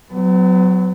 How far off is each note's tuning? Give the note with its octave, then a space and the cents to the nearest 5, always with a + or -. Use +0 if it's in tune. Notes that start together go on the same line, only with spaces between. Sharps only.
F#3 +0 B3 +40